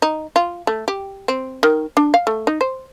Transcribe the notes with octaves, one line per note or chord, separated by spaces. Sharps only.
D#4
F4
A3
G4
C4
D#3
D4
F5
A3
D#4
C5